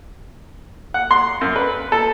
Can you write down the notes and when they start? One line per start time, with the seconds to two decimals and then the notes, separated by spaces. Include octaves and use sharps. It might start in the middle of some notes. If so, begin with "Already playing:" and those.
0.94 F#5
1.11 C6
1.41 F#2
1.56 B4
1.92 A4